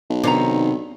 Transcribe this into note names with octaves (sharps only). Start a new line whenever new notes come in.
B1
C3 D#3 B3 D4 A#5